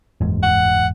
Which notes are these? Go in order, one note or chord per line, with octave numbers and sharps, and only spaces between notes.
F#1 E2 G#2
F#5